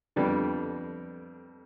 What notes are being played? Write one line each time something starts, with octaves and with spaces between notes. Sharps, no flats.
F2 D3 G3 B3 D4